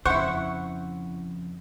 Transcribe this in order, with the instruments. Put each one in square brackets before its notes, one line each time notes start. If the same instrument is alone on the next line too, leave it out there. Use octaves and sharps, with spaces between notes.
[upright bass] F2 C#3 [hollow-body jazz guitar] E4 C5 [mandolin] F#5 [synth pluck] C#6